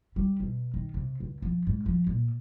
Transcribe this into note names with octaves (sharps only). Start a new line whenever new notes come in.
G3
B2
D#3
C3
C#2
F3
G#2
F3
A#2